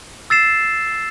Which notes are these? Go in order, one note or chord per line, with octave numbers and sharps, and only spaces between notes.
E6 A6 C7 E7